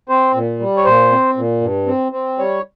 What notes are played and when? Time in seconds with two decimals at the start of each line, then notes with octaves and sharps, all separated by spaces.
0.09 C4 C5
0.34 A#2
0.59 G3
0.77 C#5
0.85 A#2 C5
1.11 C4
1.37 A#2
1.61 G2
1.87 C4
2.12 C4
2.38 G3 C#5